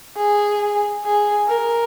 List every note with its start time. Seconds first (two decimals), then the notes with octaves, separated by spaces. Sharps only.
0.17 G#4
1.03 G#4
1.47 A#4